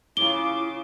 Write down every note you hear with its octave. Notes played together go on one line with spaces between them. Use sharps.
C#3 E4 F4 D6 G7